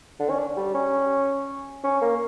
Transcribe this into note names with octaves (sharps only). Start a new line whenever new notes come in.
D3
C#4
D4
G3
C#4
C#4
A#3